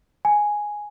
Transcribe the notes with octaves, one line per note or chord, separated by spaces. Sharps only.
G#5